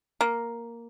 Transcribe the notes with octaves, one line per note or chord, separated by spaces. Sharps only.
A#3